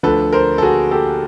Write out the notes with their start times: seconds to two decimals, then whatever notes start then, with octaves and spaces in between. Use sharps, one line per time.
0.03 D2 D3 F3 A4 B4
0.33 A#4 C5
0.58 A4
0.62 F#4 G#4
0.91 G4 A4